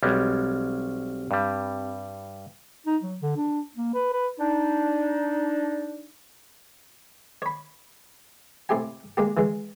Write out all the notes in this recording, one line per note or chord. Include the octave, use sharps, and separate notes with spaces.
B1 G3 G#3 C4 G4 F6
G2 G3
D#4
F#3
D3
D4
A#3
B4
B4
D4 D#4
C#5 B5
A2 C3 G4 G#5
G#3 A#3 G4
E3 G#3